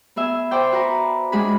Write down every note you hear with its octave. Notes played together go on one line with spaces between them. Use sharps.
B3 G#4 E5
C5 D5 G5
F#4 B4 A#5
G#3 D4 F#4 G#4 B5